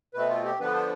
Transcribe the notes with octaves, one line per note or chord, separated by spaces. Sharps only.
B2 A3 C4 B4
F4
G4
D3 F3 B3 D4 B4
C5